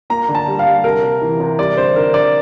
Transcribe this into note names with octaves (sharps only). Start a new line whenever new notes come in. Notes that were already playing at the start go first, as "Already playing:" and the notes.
A#3 A#5
D3
A5
G3
F5
G3
C3 A#4
C3
E3
C3
G3 D5
D3 C5
D3 A#4
D3 D5